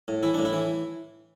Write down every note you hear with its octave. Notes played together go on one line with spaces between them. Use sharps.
A2
E3 E4
A2 D4
E4
E3